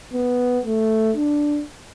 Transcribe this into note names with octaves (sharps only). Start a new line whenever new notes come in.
B3
A3
D4